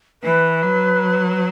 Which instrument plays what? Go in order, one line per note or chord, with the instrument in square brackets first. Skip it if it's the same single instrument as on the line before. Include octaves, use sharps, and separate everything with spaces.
[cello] E3 [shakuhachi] B4
[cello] F#3